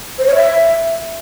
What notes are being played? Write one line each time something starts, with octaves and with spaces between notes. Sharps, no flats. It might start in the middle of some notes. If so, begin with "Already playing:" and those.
C5
C#5
E5